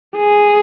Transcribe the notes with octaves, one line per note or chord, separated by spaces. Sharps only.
G#4